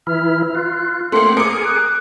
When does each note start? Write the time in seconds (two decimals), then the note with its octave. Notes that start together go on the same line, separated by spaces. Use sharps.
0.07 E3 E4 F6
0.55 F4 F#6
1.12 A3 A#3 C4 F#5 C6
1.37 G#4 A#4 D6 C#7
1.65 F#6